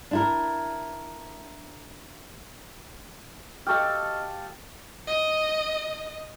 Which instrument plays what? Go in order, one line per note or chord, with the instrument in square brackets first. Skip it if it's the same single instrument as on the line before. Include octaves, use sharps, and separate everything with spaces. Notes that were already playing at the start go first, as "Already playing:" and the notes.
[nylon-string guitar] D4 E4 A#4
[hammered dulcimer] G4 A4 F5 [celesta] D#5 C#6 F6
[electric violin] D#5